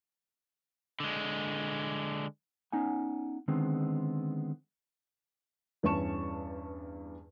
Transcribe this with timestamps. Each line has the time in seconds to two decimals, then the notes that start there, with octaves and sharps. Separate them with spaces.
1.00 D3 G#3
2.72 B3 C#4 D#4 F#5 G#5
3.48 D3 D#3 G#3 B3 C4
5.83 E2 G2 C#4 A5 C#6 E7